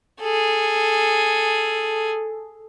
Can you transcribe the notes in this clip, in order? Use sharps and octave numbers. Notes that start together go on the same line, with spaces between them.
G#4 A4